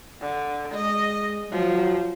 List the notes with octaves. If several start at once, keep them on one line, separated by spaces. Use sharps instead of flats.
D3
G#3 D#5
F3 F#3